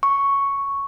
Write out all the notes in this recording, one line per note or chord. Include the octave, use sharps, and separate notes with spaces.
C#6